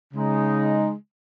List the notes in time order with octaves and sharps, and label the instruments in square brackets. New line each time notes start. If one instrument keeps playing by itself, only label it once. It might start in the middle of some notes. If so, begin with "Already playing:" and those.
[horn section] C#3 G#3 D#4